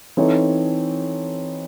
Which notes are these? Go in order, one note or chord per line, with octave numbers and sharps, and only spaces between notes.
E3 C4 D#4 A4 C#5